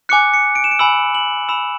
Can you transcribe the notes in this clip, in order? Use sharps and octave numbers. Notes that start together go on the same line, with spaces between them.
G#5 D6 F#6 C#7
C#7
D7
E7
D7
G#5 B5 E6 F#7
F#7
B5 E6 E7